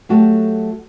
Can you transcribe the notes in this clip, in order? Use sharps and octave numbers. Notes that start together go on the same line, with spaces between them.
F#3 A3 F#4 G4 A4